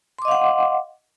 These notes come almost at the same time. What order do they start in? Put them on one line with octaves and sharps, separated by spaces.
C6 D6 D#5 F5 F#5